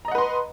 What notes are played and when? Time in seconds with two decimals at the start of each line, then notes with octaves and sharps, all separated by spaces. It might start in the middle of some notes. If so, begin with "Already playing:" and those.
0.05 A#5
0.08 D#5
0.11 F#5
0.15 B4
0.18 C6